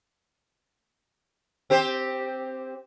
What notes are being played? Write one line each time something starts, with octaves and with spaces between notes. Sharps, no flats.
C4 G4 C5